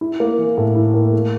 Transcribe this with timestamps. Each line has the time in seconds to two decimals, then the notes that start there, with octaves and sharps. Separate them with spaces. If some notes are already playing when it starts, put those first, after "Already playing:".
0.01 E4
0.20 A#3
0.38 E3
0.57 A2
0.76 E4
0.94 A#3
1.13 A3